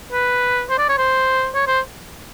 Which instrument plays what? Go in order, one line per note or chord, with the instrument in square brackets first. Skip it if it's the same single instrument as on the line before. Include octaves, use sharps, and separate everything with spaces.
[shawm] B4
C5
D5
C#5
C5
C#5
C5